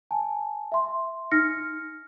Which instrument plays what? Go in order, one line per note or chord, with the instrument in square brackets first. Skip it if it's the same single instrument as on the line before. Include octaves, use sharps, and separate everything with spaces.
[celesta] G#5 A5
E5 C6
D#4 F6 A#6 C#7